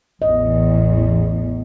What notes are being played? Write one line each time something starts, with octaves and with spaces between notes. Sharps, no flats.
A1 E2 D#5